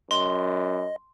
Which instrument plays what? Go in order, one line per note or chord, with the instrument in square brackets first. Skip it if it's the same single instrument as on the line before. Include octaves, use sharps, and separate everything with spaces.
[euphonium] F#2 [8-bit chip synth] D#5 [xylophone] C6